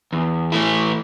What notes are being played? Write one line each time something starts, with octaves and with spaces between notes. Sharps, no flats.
E2
E3 A3 E4